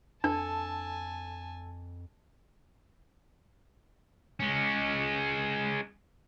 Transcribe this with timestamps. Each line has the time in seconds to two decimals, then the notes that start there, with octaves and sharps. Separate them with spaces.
0.24 F2 D4 A4 G#5 A5
4.40 G#3 C#4